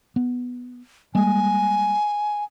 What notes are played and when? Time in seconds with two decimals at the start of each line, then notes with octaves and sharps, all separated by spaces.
0.16 B3
1.15 G3 G#3 A#3 G#5